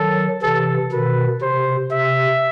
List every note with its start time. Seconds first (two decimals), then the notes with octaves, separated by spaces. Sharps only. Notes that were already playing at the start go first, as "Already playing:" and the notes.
Already playing: D#3 F#3 A4
0.42 C3 E3 A4
0.92 B2 D#3 B4
1.42 C3 C5
1.92 C3 E5